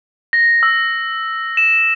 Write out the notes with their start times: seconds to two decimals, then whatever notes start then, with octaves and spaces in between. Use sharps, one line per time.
0.33 A#6
0.63 E6
1.57 E7